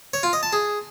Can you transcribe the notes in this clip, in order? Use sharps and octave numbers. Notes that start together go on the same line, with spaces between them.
C#5
F4
D#5
A5
G#4